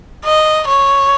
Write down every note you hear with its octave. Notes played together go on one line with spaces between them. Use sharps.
D#5
C#5